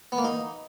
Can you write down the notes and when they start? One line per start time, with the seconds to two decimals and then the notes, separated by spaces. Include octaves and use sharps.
0.12 B3
0.18 A#3
0.24 D#4